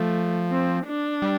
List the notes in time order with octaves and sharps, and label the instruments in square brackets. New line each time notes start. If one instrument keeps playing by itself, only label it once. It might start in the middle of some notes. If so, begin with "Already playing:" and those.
Already playing: [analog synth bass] F3 [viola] A3
[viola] C4
D4
[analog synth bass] G3